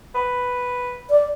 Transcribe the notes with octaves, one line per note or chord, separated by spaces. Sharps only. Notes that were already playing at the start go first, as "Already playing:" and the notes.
B4
D5